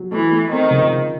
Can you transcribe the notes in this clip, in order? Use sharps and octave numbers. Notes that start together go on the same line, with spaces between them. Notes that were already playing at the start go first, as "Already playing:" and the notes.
Already playing: F#3
E3 A3
A3
D#3 C4
C#2
C#3